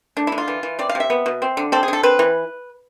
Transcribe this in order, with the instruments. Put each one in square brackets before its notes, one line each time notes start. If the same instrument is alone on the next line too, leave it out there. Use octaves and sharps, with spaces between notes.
[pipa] A3 D4
D3 E4
F4
E3
E3
C4 D5
F5
C3
E5
B3
B2
C4
D3
C4 A4
G#4
D3 A4
C4 B4
E3